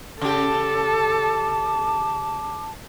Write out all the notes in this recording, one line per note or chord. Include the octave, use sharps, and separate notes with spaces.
C#3 G4 A4 A5 D6